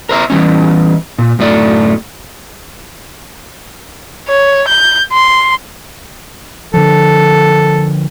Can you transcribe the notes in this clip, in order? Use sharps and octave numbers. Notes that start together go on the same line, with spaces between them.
A#4 C5 E5 A#5
E3 G3 C#4
A#2
F#2 A2 A3 D5
C#5
G6
C6
D3 F3 A4